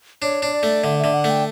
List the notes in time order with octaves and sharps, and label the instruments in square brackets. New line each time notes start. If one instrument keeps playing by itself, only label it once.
[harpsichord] D4 [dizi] C#5
[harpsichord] D4
[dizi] D5
[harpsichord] A3
[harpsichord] D3 [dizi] E5
[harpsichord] D3 [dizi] E5
[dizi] F#5
[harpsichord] A3
[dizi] G5